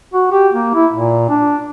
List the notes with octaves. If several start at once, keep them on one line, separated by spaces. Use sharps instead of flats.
F#4
G4
A#3
E4
A#2
D4